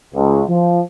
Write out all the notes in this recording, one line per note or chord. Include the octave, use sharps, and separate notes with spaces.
C#2
F3